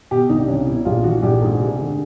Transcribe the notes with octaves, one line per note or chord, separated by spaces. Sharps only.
B2 G4
C2 D#4
D4
C2 C#4
B2 E4
A#1 F4
E3 F#4
A#1 G4
G#2 G#4
F1
D3